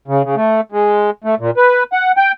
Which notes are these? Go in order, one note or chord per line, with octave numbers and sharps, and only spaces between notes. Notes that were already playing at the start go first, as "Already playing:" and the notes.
C#3
C#3
A3
G#3
A3
A#2
B4
F#5
G5